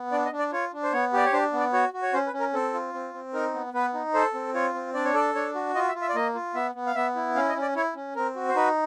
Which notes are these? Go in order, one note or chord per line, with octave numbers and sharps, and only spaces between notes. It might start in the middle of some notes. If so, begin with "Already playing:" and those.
Already playing: B3
D4 D5
D#5
D4
D5
F4 C#5
D4
C5
B3 C#5
G4 D5
C#5
D4 C5
B3
D5
F#4 C#5
F#4
C#5
C#4 C5
B4
C#4
A#4
C4 A4
F4
C4
C4
D#4 A#4
B3
B3 B4
D#4
A4 C5
C4
F4 C#5
C4
D4 D5
C#5
A4 D5
D4 C#5
F#4
F4 D#5
E5
F4
E5
D5
A#3 D#5
F4
B3 E5
B3
F5
B3 E5
E4
C#4 F5
D#5
C#4
D5
E4 C#5
C#4
C4 A#4
F#4
C5
D#4 B4